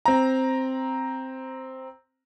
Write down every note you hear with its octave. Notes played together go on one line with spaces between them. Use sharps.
C4 A#5